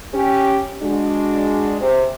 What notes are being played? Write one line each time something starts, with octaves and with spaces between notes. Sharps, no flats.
C#4 G4
G#3 D4 F#4
C3